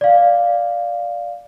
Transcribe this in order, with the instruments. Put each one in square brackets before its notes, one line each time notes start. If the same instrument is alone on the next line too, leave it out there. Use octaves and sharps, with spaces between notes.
[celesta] D5 F5